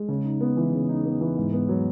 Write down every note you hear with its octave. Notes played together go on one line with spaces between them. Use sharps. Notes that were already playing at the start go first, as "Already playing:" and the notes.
Already playing: G#3
C#3
D#4
B3
E3
C#3
D#4
B3
E3
G#2
B3
F#3